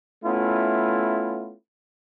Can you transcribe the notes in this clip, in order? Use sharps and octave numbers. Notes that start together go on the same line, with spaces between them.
A3 B3 C#4 E4 F4